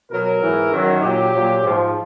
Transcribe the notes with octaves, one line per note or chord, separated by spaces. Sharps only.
B2 F#3 A#4
G#2 E3
F#2 D#3 F#3
A#2 F#3 G4
A#2 F#3
G#2 F3